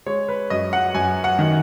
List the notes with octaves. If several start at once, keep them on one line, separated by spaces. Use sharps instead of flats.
G#3 C#5
B4
F#2 D#5
F#5
F#2 G#5
F#5
D#3